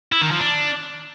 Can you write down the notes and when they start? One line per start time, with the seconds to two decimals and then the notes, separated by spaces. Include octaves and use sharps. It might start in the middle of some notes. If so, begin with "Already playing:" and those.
0.12 E4
0.22 D#3
0.31 F3
0.40 D4